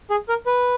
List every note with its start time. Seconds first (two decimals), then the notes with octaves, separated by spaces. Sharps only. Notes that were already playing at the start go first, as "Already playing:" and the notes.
0.10 G#4
0.29 A#4
0.46 B4